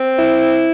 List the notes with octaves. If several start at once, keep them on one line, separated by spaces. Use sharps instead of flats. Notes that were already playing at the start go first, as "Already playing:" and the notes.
Already playing: C4
E4